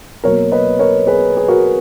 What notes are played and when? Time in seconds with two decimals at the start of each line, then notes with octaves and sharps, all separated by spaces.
0.24 B2 F#3 A#3 A#4 C#5
0.52 B4 D#5
0.79 A#4 C#5
1.07 G#4 B4
1.37 G#4
1.48 F#4 A#4